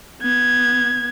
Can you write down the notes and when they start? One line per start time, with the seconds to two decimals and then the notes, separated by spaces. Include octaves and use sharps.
0.22 B3 G#6